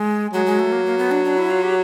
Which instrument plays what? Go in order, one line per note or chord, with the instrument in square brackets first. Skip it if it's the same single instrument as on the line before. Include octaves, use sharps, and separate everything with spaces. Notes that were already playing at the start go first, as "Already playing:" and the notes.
Already playing: [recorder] G#3
[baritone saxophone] F#3 [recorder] G#3
[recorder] G#3
A3
A#3
A#3
B3
D4
D4
E4
F4
G4